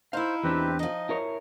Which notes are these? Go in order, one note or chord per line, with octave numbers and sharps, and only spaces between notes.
D#4 E4 C5 F5
E2 C4 D4 G4 B4
F3 D#4 D#5
E4 A#4 C#5